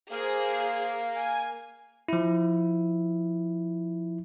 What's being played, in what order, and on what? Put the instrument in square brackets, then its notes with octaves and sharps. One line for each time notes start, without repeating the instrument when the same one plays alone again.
[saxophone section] A#3 [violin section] G#4 C5
[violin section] G#5
[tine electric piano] F3 E4